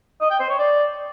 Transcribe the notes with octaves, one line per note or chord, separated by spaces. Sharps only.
D#5
G5
C5
C#5
D5